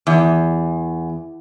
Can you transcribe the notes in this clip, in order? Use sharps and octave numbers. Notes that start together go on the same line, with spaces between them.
E2